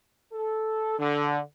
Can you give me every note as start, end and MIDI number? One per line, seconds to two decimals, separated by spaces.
0.33 0.98 69
0.98 1.39 50